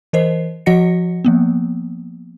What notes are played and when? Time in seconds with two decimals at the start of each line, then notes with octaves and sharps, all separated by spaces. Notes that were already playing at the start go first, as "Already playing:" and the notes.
0.13 E3 A#4 C5 D#5 C7
0.66 F3 F#4 D#5 F#5 A#6 C#7
1.25 F3 A#3 B3